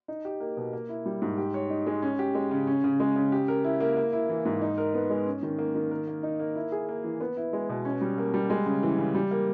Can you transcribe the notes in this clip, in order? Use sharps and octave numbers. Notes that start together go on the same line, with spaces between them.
D#4
G4
A#3
B2
A#3
E4
G3
G#2
G4
C#5
D#4
G#3
C#4
G4
G#3
C#3
C#4
C#3
G#3
C#3
G4
A#4
E4
A#3
A#3
E4
E3
G#2
D#4
A#4
B3
G#3
C#4
D#3
A#3
D#3
A#4
A#3
D#4
A#3
E4
G#4
A#3
E3
B3
E4
G#3
B2
C#4
G3
A#3
G3
G#3
C#3
E3
C#3
G3
A#3